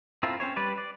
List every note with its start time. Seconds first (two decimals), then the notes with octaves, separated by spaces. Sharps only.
0.23 C4 E4 F4 A4 A#4
0.40 C4 C#4 C5 C#5
0.56 G3 B4 D5
0.78 D5